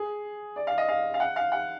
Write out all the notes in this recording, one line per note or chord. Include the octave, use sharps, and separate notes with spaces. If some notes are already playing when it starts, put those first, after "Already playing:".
Already playing: G#4
D5
F5
D#5
F5
F5
F#5
F5
F#5